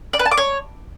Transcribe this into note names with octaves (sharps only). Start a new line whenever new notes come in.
D5
B4
A5
D6
C#5